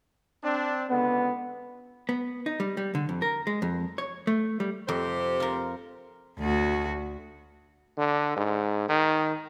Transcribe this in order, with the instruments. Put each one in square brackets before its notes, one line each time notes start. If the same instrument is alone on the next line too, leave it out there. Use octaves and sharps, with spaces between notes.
[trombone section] C4 D4
[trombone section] C#2 D3 [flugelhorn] B3
[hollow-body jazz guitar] B3
D#4
G3
G3
D3
F2
A#4
G#3
F2
C#5
A3
G3
[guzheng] F2 [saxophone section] C3 G4 C5
[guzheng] F4 A#4
[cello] D2 F#4
[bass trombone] D3
G#2
D#3